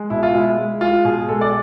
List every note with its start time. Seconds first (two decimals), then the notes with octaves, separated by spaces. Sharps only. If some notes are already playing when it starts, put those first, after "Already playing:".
Already playing: G#3
0.10 B2 E4
0.23 F4
0.34 G#3 E4
0.57 G#3
0.81 G#3 F4
1.05 B2 G#4
1.29 G#3 A4
1.41 D5